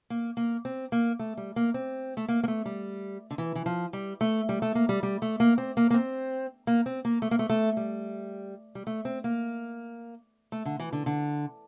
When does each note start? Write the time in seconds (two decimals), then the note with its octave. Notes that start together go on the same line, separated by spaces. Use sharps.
0.10 A#3
0.37 A#3
0.65 C4
0.92 A#3
1.19 A3
1.37 G3
1.56 A#3
1.74 C4
2.17 A3
2.28 A#3
2.43 A#3
2.48 A3
2.66 G3
3.31 D3
3.38 E3
3.55 E3
3.66 F3
3.93 G3
4.21 A3
4.49 G3
4.62 A3
4.75 A#3
4.89 G3
5.03 G3
5.22 A3
5.40 A#3
5.58 C4
5.77 A#3
5.90 A#3
5.94 C4
6.67 A#3
6.86 C4
7.05 A#3
7.22 A3
7.31 A#3
7.39 A3
7.49 A3
7.77 G3
8.75 G3
8.87 A3
9.05 C4
9.24 A#3
10.52 A3
10.65 D3
10.80 E3
10.93 D3
11.06 D3